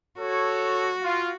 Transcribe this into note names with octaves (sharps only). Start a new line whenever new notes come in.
F#4 A4 C#5
F4